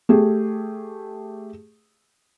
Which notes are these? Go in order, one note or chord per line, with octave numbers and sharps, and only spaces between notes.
A3 G4 G#4